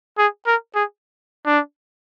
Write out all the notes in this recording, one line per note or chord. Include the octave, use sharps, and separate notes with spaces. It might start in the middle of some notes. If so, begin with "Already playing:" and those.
G#4
A#4
G#4
D4